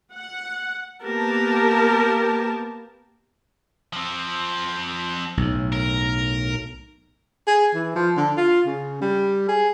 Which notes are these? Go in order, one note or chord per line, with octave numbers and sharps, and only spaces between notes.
F#5
A#3 B3 G4 A#4 A5
F3 C4
B1 A2
A#4
G#4
E3
F3
D3
F4
C#3
G3
G#4